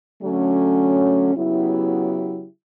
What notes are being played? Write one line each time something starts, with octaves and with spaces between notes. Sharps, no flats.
D3 F#3 A3 C#4
C#3 F#3 B3 E4 G4